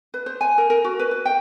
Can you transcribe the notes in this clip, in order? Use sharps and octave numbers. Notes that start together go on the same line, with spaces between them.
B4
C5
G#5
A#4
A#4
F#4
B4
B4
G5